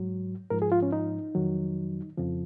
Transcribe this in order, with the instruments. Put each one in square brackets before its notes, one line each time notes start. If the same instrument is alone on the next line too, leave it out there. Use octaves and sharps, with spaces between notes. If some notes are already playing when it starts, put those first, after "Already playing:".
Already playing: [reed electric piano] G#2 F#3
G#2 F3 A#4
G#4
F4
C#4
D#4
F2 D#3 F#3
F2 C#3 F3